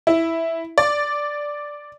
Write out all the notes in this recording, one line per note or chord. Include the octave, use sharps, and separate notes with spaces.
E4
D5